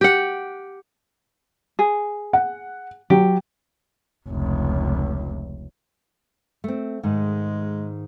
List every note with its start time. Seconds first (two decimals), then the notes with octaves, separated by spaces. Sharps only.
0.01 G4 F#5
1.79 G#4
2.33 F#5
3.10 F#3 G4
4.29 F1 C#2
6.64 A3 C4
7.03 G#2 D#3 G#3